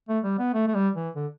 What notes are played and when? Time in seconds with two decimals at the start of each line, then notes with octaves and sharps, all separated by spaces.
0.09 A3
0.24 G3
0.39 B3
0.54 A3
0.67 A3
0.75 G3
0.95 E3
1.16 D3